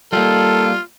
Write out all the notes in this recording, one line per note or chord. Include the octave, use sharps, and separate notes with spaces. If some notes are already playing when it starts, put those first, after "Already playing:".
G3 A#3 F4 A4